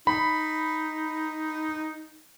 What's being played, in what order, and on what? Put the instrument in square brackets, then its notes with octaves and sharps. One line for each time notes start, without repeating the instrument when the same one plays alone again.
[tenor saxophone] D#4 [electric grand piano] B5